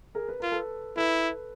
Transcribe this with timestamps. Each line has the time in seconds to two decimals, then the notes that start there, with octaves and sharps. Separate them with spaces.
0.15 G#4 A#4
0.29 B4
0.40 F4 A#4
0.52 A4 B4
0.97 E4 A4 B4